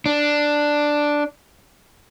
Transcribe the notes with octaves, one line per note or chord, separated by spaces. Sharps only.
D4